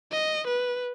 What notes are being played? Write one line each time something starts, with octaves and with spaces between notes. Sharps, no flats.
D#5
B4